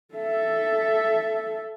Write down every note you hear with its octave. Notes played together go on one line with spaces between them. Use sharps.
A4 E5